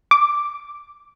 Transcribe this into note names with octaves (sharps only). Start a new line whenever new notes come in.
D6